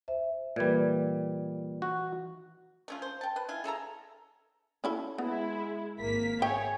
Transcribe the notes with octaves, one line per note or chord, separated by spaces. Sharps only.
C5 E5
A#2 E3 G3 B4 G#6
F#4
A3 C#4 F4
C5
G5 A5
B4
E4 F4 G#5
G#4 A4 E5 A#5
C#4 E4 A4
G#3 B3 E4
G#1 A#3 B6
G#4 C#5 E5 G5